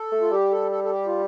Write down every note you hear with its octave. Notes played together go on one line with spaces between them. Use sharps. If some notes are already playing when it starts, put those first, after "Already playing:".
Already playing: A4
A3
F4
G3 G4
A4
A4
A4
G4
F4